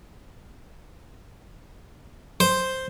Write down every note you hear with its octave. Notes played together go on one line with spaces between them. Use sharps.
C5